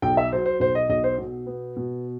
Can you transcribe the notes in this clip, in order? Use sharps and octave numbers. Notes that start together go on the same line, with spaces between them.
B1 G5
E5
F#3 C5
C5
B1 C5
D#5
B1 D#5
C5
B2
B3
B2